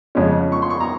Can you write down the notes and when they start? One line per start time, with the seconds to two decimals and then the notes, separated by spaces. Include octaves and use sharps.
0.15 F2 C#3 G#3 C#4
0.52 C#6
0.62 C6
0.70 C#6
0.80 A#5